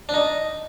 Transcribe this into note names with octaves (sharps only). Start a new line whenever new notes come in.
D4
D#4